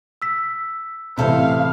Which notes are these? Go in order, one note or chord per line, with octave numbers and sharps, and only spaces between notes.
E6 B6
A1 C3 E4 A4 C5 F5